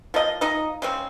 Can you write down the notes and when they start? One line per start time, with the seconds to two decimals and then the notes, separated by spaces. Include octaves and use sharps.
0.14 F3 A#3 D#5
0.41 D#4 D#5
0.82 C#3 G#3 C4